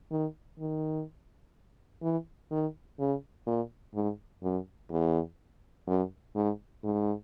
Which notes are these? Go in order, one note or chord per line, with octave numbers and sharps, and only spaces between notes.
D#3
D#3
E3
D#3
C#3
A#2
G#2
F#2
E2
F#2
G#2
G#2